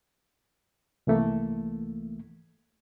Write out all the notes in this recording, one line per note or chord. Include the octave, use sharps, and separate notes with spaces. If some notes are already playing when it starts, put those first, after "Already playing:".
C2 E3 A3 A#3